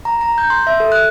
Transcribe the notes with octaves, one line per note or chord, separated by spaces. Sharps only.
A#5
A#5
G6
C6
E5
A4
F#6